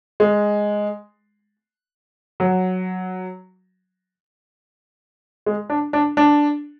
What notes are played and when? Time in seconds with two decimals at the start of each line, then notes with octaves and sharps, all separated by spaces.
0.20 G#3
2.40 F#3
5.46 G#3
5.70 D4
5.93 D4
6.17 D4